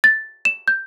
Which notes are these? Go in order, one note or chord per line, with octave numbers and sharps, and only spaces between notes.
A6
E7
G6